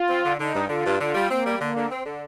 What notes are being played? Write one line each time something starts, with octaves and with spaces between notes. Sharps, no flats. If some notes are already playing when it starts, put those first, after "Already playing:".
Already playing: F4
C4
D3
D3 D#4
G2
D3 F4
G2
D3 F4
G3
A#3 C4
G3
D3 A#3
D3
C4
D3